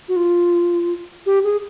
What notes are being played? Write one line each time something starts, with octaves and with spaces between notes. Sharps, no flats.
F#4
F4
G4
G#4